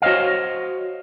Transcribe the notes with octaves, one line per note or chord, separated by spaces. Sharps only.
F#4 C5 C#5 D#5 F5